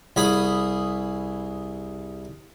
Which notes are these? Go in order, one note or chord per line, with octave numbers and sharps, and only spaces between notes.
C2 G#4 B5 D#6